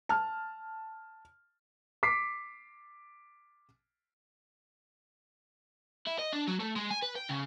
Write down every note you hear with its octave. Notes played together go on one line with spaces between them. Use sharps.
A5 F6
D6 B6 C7
E4
D#5
D4
F#3
A3
G#3
G#5
B4
G5
C#3